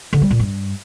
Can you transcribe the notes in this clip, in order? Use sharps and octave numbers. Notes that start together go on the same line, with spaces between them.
D3
G3
A#2
G2